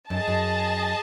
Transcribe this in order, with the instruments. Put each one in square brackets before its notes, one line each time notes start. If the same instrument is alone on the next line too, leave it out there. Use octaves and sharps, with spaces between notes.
[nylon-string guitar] F#2 [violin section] G#4 D#5 A5
[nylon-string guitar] F#2